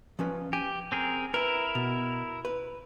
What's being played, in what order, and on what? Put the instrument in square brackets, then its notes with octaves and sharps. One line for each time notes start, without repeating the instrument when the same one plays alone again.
[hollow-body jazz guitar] F3 C#4 B4
[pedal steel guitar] G4 [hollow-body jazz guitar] G#5
[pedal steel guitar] C4 G#4 A#4
[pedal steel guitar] E4 A#4 [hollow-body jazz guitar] B4
[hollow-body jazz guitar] B2
B4